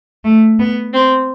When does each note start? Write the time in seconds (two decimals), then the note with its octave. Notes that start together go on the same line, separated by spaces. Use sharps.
0.24 A3
0.59 B3
0.93 C4